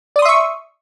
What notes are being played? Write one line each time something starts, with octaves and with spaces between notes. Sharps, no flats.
D5 E5 C6 C#6 D#6